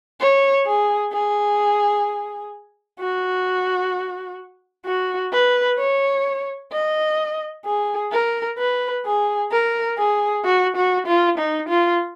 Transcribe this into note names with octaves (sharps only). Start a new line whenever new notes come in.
C#5
G#4
G#4
F#4
F#4
B4
C#5
D#5
G#4
A#4
B4
G#4
A#4
G#4
F#4
F#4
F4
D#4
F4